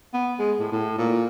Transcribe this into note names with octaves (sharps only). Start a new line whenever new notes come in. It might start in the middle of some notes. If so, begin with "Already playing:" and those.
B3
G#3
A2
A2
A#2